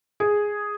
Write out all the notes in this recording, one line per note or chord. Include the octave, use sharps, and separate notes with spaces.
G#4